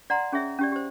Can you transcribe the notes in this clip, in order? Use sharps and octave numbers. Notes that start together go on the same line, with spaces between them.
D5 F#5 A#5 C6
C#4 G#4 C#5 E5
C#4 G4 D5
G4 C5